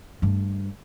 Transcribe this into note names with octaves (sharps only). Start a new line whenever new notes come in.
G2 A3